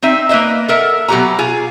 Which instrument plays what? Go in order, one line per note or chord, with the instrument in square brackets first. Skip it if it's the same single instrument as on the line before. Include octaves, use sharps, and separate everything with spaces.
[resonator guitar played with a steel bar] C4 D#4 E5
A#3 B4 C5 D#5 E5
A4 A#4 E5 F#5
B2 F#3 F4 G4 F#5 A#5
F4 G#4